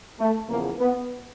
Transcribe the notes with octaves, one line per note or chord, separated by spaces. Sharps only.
A3
E2 C#3 F3 A#3
B3